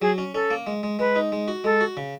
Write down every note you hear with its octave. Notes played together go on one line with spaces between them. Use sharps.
F#3 G#4
C#4
C#4 A4
A#3
G#3
G#3
G#3 B4
D#4
G#3
F#4
G#3 A4
F#4
C#3